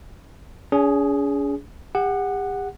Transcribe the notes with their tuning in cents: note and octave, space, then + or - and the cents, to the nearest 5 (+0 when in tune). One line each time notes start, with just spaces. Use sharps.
C#4 +45 G#4 +0
G4 +40 F#5 +0